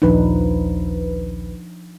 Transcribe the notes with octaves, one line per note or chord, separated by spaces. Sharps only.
A#1 D#2 F3 D4 D#4 B4